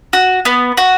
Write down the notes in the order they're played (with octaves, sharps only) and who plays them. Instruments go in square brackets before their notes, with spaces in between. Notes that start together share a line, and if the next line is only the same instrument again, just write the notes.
[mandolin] F#4
B3
F#4